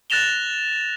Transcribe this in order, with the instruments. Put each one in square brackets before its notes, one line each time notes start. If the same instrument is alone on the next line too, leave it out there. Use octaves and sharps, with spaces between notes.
[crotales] F#6 A6 A#6 E7 F7 G7